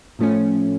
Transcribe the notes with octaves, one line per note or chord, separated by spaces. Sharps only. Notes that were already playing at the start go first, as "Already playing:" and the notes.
A2 F3 A3 C#4